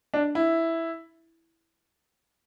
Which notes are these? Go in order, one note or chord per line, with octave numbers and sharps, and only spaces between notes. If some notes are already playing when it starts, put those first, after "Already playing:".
D4
E4